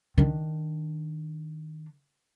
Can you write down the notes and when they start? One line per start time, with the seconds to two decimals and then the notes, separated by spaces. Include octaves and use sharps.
0.18 D#3 D4